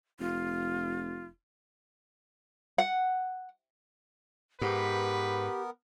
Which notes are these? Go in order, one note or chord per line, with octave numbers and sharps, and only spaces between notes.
F1 F4
F#5
G#2 B3 G4 A#4 B4